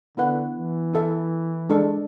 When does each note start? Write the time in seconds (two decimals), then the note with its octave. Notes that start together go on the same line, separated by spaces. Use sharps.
0.17 D3 B3 E4 B4 F#5
0.56 E3
0.94 E4 A4 E5
1.69 G#3 D4 A4